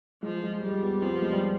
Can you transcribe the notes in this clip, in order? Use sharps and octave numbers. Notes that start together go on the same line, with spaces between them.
F3 G#3
G#3
G3 G#3
B3
F3 C4
B3
G#3
G3